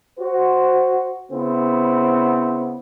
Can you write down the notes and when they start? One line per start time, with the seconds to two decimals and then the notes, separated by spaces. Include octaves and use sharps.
0.20 F#4 C5
1.32 C#3 B3 C4 E4